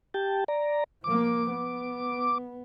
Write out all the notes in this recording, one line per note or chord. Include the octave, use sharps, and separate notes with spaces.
G4 G5 A5
D5 A#5
F3 A#3 D6
B3